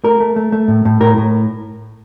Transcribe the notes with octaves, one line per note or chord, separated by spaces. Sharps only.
A3 A#4
A3
A3
A3
A2
A2
A2 A#4
A2